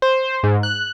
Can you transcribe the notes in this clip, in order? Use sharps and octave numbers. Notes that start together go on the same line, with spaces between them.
C5
G#2
F#6